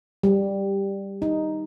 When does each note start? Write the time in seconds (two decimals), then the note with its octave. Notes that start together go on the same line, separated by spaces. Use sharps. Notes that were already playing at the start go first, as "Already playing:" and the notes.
0.23 G3
1.22 D#4